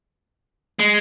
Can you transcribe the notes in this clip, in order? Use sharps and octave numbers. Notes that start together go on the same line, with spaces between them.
G#3